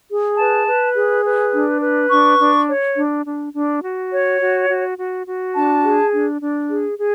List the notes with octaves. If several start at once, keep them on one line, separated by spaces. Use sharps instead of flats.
G#4
B4 A5
B4
G#4
B4
D4
B4
D4 C#6
D4
C#5
D4
D4
D4
F#4
C#5
F#4
F#4
F#4
F#4
D4 A5
G#4
D4
D4
G#4
G#4